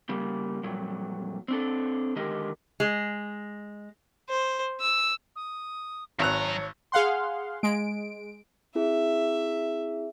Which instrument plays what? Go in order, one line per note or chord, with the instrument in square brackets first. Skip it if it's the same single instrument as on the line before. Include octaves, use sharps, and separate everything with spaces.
[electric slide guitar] C#3 G3 A#3
F2 A#2 F#3 G3
C4 D4 A4
D3 D#3 G#3 G4 A#4 D#5
[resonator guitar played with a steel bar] G#3
[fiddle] C5
E6
[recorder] D#6
[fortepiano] G#1 F#6 [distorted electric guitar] F#2 A#5 [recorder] C#5
[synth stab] G#4 F5 F#5 C6
G#3 D7
[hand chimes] C4 E4 G#4 [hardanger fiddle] E5